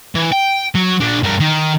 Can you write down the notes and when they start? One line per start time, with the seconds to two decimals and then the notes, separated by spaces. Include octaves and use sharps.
0.15 E3
0.32 G5
0.75 F#3
1.01 A#2 D4
1.23 G2 A#4
1.40 D#3